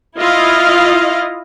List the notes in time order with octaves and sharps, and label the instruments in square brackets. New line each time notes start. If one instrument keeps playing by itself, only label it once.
[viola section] E4 F4 D#5 F5